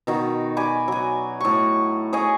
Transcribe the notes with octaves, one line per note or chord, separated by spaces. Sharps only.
B2 D#3 F#4
D5 G#5 B5
F#3 G#5
A2 C#6
G#4 C#5 D#5 G#5